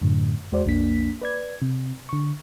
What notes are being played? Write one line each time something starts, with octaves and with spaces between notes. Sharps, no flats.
F#2 A2 D3
E2 G#3 F#4 C5 D5
B1 F2 A#3 D4 B6
B4 D5 G#6
C3
D3 C#6